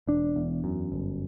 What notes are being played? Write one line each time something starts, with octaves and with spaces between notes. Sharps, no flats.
E1 D4
E2
F#2
G1